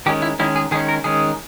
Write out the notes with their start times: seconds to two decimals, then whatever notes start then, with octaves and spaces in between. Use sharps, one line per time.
0.06 D#3 G#3 C#4 G4
0.22 E4
0.39 D#3 G#3 C#4 E4
0.56 G#4
0.71 D#3 G#3 C#4 G#4
0.89 A#4
1.04 D#3 G#3 C#4 G#4